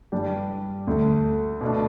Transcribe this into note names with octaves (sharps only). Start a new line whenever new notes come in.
G2 G3 D4 G4
D2 D3 A3
B2 A3 D4